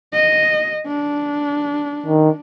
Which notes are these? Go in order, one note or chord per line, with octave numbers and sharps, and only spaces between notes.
D#5
D4
D#3